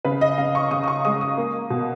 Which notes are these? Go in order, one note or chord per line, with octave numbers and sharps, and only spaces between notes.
C#3 B4
D#5
C#3 F5
C#6
C#3 D#6
D#6
C#6
G#3 D#6
D#6
A#3
B2